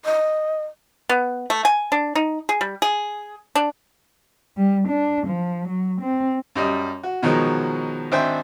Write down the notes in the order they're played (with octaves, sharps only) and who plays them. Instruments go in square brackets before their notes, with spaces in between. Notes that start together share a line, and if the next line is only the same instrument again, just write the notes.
[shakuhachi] D#5
[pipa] B3
A3
G#5
D4
D#4
G#4
G3
G#4
D4
[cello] G3
D4
F3
F#3
C4
[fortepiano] F#2 G3 D#5
F#4
B2 D#3 F3 F#3 G#3
G#1 D4 C5 E5 G5